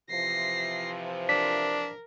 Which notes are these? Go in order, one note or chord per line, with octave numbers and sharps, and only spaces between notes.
C3 E3 F3 A#6 C7
D4 A#4 B6